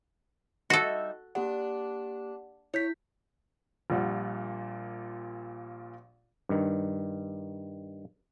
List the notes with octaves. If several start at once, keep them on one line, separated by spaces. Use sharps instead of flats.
G3 D#4 F#4 A4 E5
A#3 D4 G4 F#5
E4 C#5 G6 B6
A#1 A#2 G3 F#5
G2 D#3